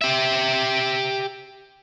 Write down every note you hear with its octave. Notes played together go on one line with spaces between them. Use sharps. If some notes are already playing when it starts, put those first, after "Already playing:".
G4 E5